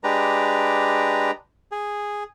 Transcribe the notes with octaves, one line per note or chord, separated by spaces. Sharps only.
G#3 D4 G4 B4 A#5
G#4